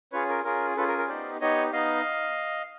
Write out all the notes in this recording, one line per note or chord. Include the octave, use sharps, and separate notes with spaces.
C#4 F4 G#4 B4 C#5
A#4
C#4 F4 G#4 A#4
C#4 F4 G#4 A4 B4
A#4
A#4
B3 D#4 G4 C5 D5
B3 D#4 G4 C#5 D#5
B3 D#4 D#5 F5